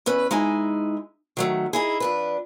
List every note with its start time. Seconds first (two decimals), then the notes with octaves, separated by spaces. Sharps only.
0.06 E2 C#4 B4
0.31 G#3 D#4 E4 G#5
1.37 D#3 F#3 A3
1.73 D#4 E4 G#4
2.00 F2 D4 B4